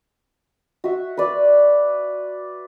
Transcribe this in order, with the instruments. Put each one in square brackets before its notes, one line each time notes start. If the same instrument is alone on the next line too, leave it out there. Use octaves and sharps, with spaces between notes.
[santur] F#4 E5
B4 D5